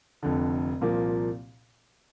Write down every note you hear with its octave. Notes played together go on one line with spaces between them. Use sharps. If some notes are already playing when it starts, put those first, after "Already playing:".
F1 F2 D3
C2 A#2 F3 A#3